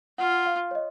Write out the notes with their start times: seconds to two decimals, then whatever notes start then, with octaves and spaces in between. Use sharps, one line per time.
0.18 F4 F#5
0.46 F5
0.71 C#5
0.75 D#5